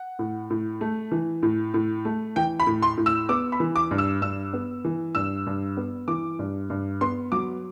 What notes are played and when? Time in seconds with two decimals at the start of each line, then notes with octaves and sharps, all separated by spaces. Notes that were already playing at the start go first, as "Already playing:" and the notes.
Already playing: F#5
0.19 A2
0.50 A2
0.81 A3
1.12 E3
1.43 A2
1.74 A2
2.05 A3
2.36 E3 G5
2.60 B5
2.67 A2
2.82 C6
2.97 A2
3.06 E6
3.29 B3 D6
3.52 B5
3.60 E3
3.76 D6
3.91 G2
3.98 E6
4.21 G2 E6
4.53 B3
4.85 E3
5.15 G2 E6
5.47 G2
5.77 B3
6.08 E3 D6
6.39 G2
6.70 G2
7.01 B3 C6
7.32 F#3 D6